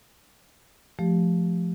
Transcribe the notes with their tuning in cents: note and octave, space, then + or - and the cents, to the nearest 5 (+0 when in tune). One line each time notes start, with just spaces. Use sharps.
F3 +0 A3 -20 G4 +0